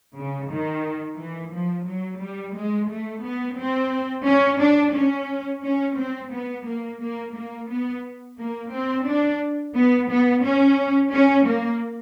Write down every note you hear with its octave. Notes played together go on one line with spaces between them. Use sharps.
C#3
D#3
E3
F3
F#3
G3
G#3
A3
B3
C4
C#4
D4
C#4
C#4
C4
B3
A#3
A#3
A#3
B3
A#3
C4
D4
B3
B3
C#4
C#4
A#3